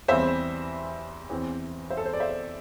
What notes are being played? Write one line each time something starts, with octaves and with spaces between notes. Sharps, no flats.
E2 E3 G3 C4 C5 E5
E2 E3 C4
C5 E5
A4
C5
D5
C5 E5